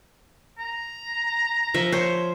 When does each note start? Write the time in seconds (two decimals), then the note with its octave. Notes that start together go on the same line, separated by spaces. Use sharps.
0.59 A#5
1.74 F3 E5
1.92 C5 C#5